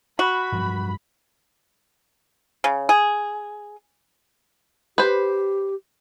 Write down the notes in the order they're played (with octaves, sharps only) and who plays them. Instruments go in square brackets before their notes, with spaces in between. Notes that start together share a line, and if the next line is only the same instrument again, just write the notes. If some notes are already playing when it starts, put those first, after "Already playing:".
[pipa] F#4 [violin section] B5
[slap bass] G2 F3 F#3
[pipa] C#3
G#4
[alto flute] G4 [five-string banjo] B4 C5